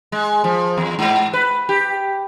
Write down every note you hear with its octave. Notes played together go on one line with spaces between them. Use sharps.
G#3
F3
E2
G#2
B4
G4